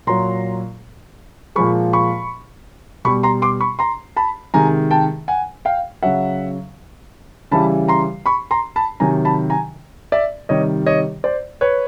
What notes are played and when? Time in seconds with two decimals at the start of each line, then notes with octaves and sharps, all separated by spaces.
0.07 A#2 F#3 A#5 C6
1.56 A#2 F3 G#3 B5 C#6
1.93 B5 C#6
3.05 B2 G3 B5 C#6
3.23 A#5 C6
3.42 C6 D6
3.61 B5 C#6
3.79 A#5 C6
4.16 A5 B5
4.54 C3 D#3 G#3 G#5 A#5
4.91 G5 A5
5.28 F#5 G#5
5.65 F5 G5
6.03 C#3 F#3 E5 F#5
7.51 C#3 E3 G3 A5 B5
7.88 A#5 C6
8.26 B5 C#6
8.51 A#5 C6
8.76 A5 B5
9.00 C3 D#3 F#3 G#5 A#5
9.25 A5 B5
9.50 G#5 A#5
10.12 D5 E5
10.49 C3 D#3 G3 C#5 D#5
10.86 C#5 D#5
11.24 C5 D5
11.61 B4 C#5